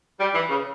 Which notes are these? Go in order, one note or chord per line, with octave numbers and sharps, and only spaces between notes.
G3
E3
C#3